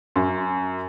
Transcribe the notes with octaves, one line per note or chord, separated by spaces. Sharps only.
F#2